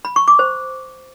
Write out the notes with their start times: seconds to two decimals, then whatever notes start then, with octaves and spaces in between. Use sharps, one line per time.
0.05 B5
0.16 C#6
0.28 D6
0.39 C5